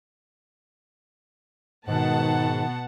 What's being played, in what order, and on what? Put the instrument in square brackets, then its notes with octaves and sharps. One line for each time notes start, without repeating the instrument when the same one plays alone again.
[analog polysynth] G#2 [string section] B2 B3 [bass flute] D#3 [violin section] F#5 A5